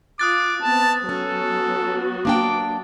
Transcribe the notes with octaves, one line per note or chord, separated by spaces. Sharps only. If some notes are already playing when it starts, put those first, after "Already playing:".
F4 D6 D#6 F#6 A6
B3 C4 A5
F#3 B3 C#4 F#4 A4
A#3 D4 G5 D6